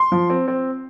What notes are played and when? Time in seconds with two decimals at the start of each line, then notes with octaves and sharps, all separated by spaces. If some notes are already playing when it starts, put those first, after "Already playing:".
Already playing: C6
0.12 F3
0.30 C4
0.48 C4